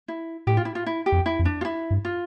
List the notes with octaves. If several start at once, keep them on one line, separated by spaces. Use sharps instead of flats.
E4
A2 G4
F4
E4
F4
E4
G4
F2
E4
F2
D4
F4
E4
G2
F4